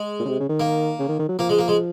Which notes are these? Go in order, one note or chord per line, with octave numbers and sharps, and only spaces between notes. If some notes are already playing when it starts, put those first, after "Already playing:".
Already playing: G#3
A#2
C#3
C3
C#3
D#3
A#3
C#3
D#3
D#3
F#3
F3 A#3
G#3
A#3
G#3